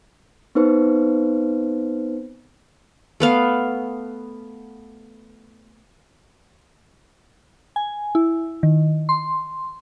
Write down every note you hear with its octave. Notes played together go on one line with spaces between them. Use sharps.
B3 C4 D#4 B4 C5
A3 B3 F5
G#5
E4
D#3
C6